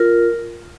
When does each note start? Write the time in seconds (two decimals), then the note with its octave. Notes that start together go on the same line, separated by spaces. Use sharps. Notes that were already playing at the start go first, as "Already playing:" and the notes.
Already playing: F4 A#4